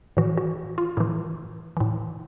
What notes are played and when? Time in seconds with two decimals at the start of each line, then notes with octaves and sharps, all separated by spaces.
0.17 A2 E3 F#4
0.38 F#4
0.78 F4
0.97 A2 E3 E4
1.77 A2 E3